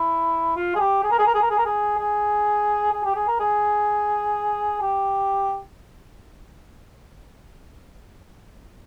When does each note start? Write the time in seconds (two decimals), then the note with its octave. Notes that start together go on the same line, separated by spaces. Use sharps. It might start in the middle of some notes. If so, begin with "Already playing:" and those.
Already playing: E4
0.56 F4
0.75 G#4
0.80 G4
1.04 G#4
1.11 A#4
1.18 G#4
1.27 A#4
1.34 G#4
1.42 A#4
1.50 G#4
1.58 A#4
1.66 G#4
1.98 G#4
2.92 G#4
3.04 G4
3.16 G#4
3.28 A#4
3.40 G#4
4.81 G4